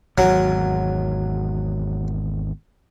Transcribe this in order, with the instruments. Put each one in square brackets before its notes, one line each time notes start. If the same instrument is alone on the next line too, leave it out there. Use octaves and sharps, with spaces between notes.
[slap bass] G#1 E2 [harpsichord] F#3